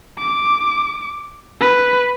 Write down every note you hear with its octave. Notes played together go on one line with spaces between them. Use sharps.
D6
B4